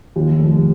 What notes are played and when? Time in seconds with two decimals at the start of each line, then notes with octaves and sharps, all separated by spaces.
0.16 D#2
0.40 F1